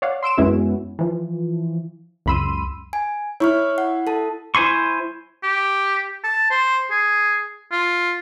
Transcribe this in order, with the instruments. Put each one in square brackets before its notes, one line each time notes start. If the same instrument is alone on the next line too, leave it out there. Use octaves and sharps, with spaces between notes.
[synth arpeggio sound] C#5 D5 F5 F#5
C6 E6 D7 E7
F#2 G#3 B3 C#4 E4 F#4
E3 F3
C#2 F#2 B5 C6 E6 D#7
[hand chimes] G#5
[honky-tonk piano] E4 [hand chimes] C#5 C#6 F6
[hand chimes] F#5
A4 A5
[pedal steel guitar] E4 C5 G#5 C6 C#6
[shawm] G4
A5
C5
G#4
F4